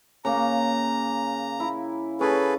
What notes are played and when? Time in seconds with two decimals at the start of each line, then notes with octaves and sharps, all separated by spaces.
0.25 C#3 A#3 A#5
1.60 E4
2.21 C#4 G#4 A4 B4